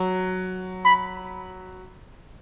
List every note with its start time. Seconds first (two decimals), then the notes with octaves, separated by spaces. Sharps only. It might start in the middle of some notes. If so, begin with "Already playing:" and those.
Already playing: F#3
0.85 B5